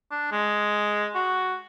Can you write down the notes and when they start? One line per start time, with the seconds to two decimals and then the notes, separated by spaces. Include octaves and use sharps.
0.12 D4
0.32 G#3
1.15 F#4